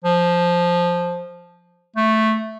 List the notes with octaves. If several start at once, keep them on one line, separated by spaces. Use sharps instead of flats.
F3
A3